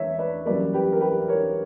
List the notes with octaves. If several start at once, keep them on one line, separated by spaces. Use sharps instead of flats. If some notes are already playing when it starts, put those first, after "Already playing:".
Already playing: E2 C#5 E5
B4 D5
F#2 E3 G3 A#3 B4 D5
G4 B4
A#4
G4 B4
A#4 C#5